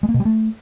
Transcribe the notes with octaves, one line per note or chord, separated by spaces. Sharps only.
G#3
A#3
B2
G3
A3